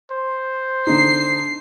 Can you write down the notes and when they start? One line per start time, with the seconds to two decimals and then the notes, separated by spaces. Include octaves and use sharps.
0.11 C5
0.87 D3 D#4 C7